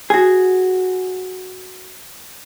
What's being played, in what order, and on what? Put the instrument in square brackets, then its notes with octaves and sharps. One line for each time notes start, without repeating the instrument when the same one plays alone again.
[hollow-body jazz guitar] F#4 G#4